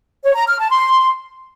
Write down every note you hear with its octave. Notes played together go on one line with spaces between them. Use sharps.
C#5
A#5
F6
A5
C6